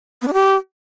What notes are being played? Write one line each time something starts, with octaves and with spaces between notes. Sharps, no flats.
B3
D4
G4